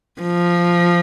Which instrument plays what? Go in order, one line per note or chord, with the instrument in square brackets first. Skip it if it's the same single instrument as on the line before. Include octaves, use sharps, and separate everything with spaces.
[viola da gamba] F3